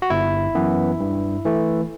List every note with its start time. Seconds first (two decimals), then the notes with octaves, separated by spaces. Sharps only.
0.02 F#4
0.10 G1 E4
0.55 F#2 E3 B3
1.00 G2
1.45 E3 A3